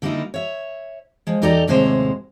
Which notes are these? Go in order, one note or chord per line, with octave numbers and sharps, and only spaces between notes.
D3 G3 A#3 C#4 D#4 E4
C#5 E5
F3 G#3
E2 D#4 G4 A4 D5 A#5
D#2 A2 C3 G#3 C5 C#5